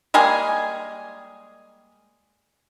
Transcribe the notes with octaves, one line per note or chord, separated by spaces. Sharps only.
G3 G#3 A#3 G#4